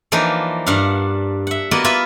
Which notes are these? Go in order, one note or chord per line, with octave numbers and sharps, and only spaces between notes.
E3 F3 A#3 D4 D#4
G2 D4 F5 F#5
E5 F#5
A#3 B3 F#4 D5 D#5
F4 B4 E5 B5